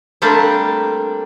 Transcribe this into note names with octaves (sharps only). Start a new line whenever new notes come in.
G3 A3 A#3 C4 D4